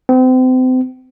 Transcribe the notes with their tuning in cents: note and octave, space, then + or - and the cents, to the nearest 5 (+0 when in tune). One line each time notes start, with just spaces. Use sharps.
C4 -35